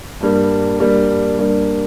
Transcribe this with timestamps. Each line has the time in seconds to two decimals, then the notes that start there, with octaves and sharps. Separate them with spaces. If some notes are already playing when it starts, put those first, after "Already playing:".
0.20 G2 G3 A#3
0.80 G2 G3 A#3
1.38 G2 G3 A#3